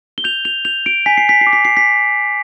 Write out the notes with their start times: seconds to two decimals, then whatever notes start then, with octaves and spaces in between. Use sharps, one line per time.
0.18 G7
0.24 G6 F7
0.45 F7
0.65 G6 F7
0.86 D7
1.06 G#5 B6
1.17 C7
1.29 B6
1.41 C7
1.47 D6
1.53 B6
1.65 C7
1.77 B6